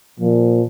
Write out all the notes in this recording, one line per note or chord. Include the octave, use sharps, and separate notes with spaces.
A#2 F3